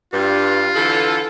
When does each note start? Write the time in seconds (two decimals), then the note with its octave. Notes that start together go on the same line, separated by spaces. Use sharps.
0.13 G2 F4
0.76 D3 E3 A4